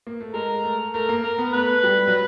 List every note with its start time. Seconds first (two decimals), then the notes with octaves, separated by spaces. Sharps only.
0.07 A#3
0.20 A3
0.34 G#3 A#4
0.64 A3
0.94 A3 A#4
1.09 A#3
1.23 A#4
1.38 B3
1.53 A3 B4
1.84 G3
2.07 F#3